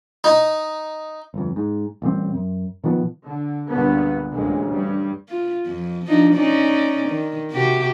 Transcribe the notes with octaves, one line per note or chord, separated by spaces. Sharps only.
D#4
G1 F2
G#2
A1 A#2 G3 C4
F#2
A#2 D#3 F3 B3
D3
C#2 G2 A#2 D3 B3
A1 D2 A#2 G#3
G2 G3
F4
F2
F3 D4 D#4
C#4 D#4 D5
D#3
C3 F#4 G4